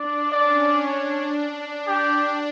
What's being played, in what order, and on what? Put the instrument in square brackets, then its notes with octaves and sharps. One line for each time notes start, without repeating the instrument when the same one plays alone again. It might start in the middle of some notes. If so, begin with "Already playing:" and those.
Already playing: [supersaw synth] D4 [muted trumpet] D5
[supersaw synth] C#4 [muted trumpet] D5
[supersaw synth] D4 [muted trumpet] C#5
[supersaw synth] D4
[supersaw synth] D4 [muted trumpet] G4